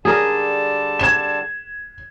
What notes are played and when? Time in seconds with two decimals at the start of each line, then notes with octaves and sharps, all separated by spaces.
0.05 D3 G3 G#4 A#4 A5
0.99 G#6 E7